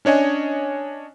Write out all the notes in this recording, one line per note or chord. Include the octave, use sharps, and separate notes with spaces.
C#4 D4 C#5 D#5 G#5